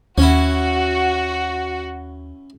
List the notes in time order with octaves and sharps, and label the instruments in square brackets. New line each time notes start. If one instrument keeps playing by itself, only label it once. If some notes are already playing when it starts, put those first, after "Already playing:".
[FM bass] D#2 [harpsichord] C#4 E4 [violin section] F#4